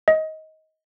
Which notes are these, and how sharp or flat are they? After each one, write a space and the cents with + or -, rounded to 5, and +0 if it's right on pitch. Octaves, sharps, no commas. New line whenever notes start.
D#5 +20